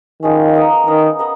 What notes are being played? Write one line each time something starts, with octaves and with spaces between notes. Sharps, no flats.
D#3 F3 G#3 C#4
B3 D#4 A#4 D#5
D#3 B3 D#4 A#4 D#5
B3 D#4 A#4 D#5